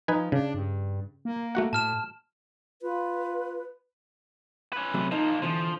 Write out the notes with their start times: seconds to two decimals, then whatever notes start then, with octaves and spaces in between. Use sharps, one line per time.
0.08 F3 D#4 B4 G#5
0.32 C#3 D4
0.54 G2
1.25 A#3
1.55 A3 F#4 F#5
1.73 A2 A5 F6 E7
2.82 F4 B4
4.73 C#4 B4
4.94 C3 F#3 A3
5.12 F3 A#3 D#4
5.42 B2 D3 E3 F3